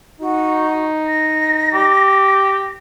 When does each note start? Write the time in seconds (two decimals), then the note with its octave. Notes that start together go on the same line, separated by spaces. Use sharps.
0.21 D#4 F#4
1.07 A#6
1.73 G4